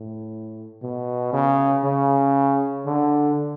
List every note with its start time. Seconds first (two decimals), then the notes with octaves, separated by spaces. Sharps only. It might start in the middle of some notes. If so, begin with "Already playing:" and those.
Already playing: A2
0.83 B2
1.33 C#3
1.84 C#3
2.86 D3